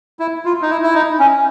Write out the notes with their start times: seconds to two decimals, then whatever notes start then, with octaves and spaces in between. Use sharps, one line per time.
0.19 E4
0.45 F4
0.62 D#4
0.70 E4
0.83 E4
0.94 D#4
1.19 C#4